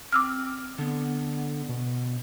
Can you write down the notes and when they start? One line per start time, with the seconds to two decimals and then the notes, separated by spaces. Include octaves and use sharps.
0.12 C4 D6 E6 F6
0.78 D3 B3
1.69 B2